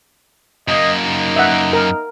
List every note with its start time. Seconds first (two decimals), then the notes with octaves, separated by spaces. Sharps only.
0.68 F#2 A#3 D#5
1.02 D#4
1.36 E5 F#5
1.73 A#4